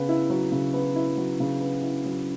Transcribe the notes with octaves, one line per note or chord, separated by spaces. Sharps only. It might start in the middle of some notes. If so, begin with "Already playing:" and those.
Already playing: C#3 B3
E4
F#3
C#3
B3
E4
F#3
C#3
B3
E4
F#3